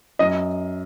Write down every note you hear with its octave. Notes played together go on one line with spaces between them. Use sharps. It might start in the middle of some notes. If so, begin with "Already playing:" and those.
F#2 D#5